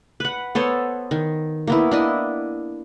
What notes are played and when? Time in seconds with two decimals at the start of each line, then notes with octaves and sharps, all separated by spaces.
0.20 B4 F#5
0.55 B3 A4 C5 C#5
1.11 D#3
1.67 A#3 B3 E4
1.91 D4 E4 D#5